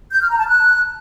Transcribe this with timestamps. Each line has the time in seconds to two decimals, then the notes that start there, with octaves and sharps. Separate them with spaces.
0.13 G6
0.21 F6
0.30 A#5
0.39 A5
0.47 F#6